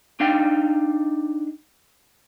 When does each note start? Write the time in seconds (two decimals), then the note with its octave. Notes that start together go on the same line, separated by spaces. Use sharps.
0.20 D4 D#4 F5 G5